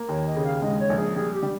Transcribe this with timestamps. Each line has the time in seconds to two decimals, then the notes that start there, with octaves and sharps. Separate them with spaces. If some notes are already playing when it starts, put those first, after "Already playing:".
Already playing: A#3
0.09 D#2 C#5
0.26 D#5
0.36 C#3
0.45 F5
0.62 G#2 D#5
0.80 C#5
0.90 A#1
0.98 G#4
1.16 G3 G#4
1.34 G4
1.43 G3